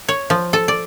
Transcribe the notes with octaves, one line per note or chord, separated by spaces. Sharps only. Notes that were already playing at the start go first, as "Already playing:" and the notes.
C#5
F3
A4
D5